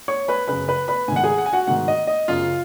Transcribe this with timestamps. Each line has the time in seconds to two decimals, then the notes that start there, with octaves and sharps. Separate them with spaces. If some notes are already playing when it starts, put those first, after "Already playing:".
0.08 C#5 C#6
0.28 B4 B5
0.48 F#2 C#3 B4 B5
0.68 B4 B5
0.88 B4 B5
1.08 G#2 G#5
1.12 D#3 F#5
1.24 G#4 G#5
1.38 F#5
1.46 G#5
1.53 F#4 F#5
1.67 G#2 D#3 F#4 F#5
1.88 D#5
2.07 D#5
2.28 F#2 C#3 F4 F5